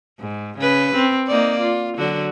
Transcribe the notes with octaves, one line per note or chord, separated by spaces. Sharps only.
G#2
C#3 B4
C4
A#3 D#4 D5
F4
D3 F#3 F#4